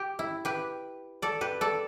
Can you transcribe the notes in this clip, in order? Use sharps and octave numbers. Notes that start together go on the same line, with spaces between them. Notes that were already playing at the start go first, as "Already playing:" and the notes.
Already playing: G4
E4
G4 B4
A4 D5
G4 B4
A4 D5